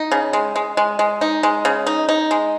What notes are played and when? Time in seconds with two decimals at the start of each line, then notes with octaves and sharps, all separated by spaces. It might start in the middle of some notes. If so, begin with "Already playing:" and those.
Already playing: D#4
0.11 C#3
0.33 G#3
0.56 G#3
0.77 G#3
0.99 G#3
1.21 D#4
1.43 G#3
1.65 C#3
1.87 D#4
2.09 D#4
2.31 G#3